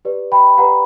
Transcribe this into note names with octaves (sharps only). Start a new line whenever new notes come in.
G4 B4 D5
G5 B5
G4 B4 D5 F#5 A#5